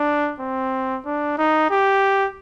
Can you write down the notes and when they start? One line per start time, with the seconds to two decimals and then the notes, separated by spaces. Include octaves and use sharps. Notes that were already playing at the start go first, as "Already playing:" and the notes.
Already playing: D4
0.40 C4
1.06 D4
1.38 D#4
1.70 G4